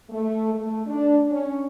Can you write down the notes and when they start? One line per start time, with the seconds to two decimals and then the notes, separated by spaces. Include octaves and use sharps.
0.10 A3
0.54 A3
0.86 D4
1.31 C#4